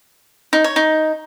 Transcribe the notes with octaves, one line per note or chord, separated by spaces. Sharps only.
D#4
C#5
D#4